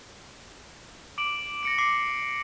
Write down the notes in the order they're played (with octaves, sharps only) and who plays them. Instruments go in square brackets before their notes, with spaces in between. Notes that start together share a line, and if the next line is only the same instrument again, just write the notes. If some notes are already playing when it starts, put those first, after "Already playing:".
[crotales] D6 D7 F#7
A#6 C#7 D7
[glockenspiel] D6 C7